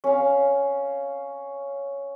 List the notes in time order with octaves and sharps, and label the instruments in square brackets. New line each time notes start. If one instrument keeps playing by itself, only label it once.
[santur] C#4 F5